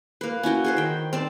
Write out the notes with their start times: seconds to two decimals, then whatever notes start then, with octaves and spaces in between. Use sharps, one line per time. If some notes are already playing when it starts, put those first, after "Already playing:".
0.21 A#3 B4
0.43 C#4 E4 F#4 G5
0.64 G#4 B4 C5
0.77 D#3 G5
1.13 C4 D5 A5